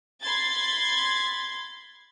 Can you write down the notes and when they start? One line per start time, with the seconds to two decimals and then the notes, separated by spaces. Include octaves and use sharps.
0.22 B5 C6 G#6 A6